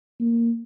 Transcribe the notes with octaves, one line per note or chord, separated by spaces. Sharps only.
A#3